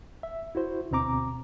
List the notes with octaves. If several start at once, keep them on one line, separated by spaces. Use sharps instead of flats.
E5
E4 F#4 C5
D2 B2 C4 A#5 D6